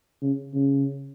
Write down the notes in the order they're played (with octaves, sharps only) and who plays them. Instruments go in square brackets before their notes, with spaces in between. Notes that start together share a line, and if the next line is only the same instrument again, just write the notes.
[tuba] C#3
C#3